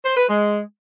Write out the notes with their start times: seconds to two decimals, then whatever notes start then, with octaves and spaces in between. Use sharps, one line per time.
0.05 C5
0.17 B4
0.28 G#3